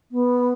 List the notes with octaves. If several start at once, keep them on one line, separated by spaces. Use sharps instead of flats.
B3